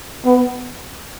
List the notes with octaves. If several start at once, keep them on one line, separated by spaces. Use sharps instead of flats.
B3